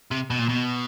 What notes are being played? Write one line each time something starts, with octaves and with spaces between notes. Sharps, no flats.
C3
B2
A#2
B2